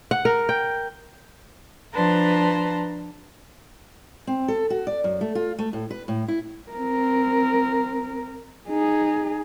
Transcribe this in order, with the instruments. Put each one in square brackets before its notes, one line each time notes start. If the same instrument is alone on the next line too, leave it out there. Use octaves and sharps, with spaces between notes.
[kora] F#5
A#4
G5
[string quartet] F3 D4 B4 A5 A#5 C6
[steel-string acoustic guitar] C4
A4
F#4
D5
F#2
A3
F4
A3
A2
B4
A2
E4
[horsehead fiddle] C4 A#4
D#4 G#4